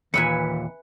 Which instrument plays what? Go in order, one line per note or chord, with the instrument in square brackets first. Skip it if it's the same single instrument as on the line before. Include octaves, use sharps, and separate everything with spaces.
[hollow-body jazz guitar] D#2 A#2 [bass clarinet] E3 [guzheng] B4 E5 G#5 [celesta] C#7